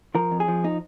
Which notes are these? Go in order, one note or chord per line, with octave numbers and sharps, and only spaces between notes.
F3 A#4
F2
G#4
F3
D#4